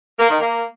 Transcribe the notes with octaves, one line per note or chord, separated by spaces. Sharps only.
A#3
D#3
A#3